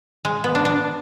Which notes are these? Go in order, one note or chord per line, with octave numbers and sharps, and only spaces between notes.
G#3
B3
D4
D4